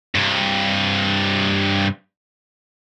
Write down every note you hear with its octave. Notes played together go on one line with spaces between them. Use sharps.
G2 C3